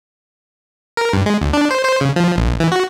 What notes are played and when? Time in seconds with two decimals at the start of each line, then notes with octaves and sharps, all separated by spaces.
0.97 A#4
1.13 G2
1.26 G#3
1.42 D2
1.53 D4
1.71 C5
1.85 C5
2.01 C#3
2.16 F3
2.37 A#1
2.60 E3
2.72 F#4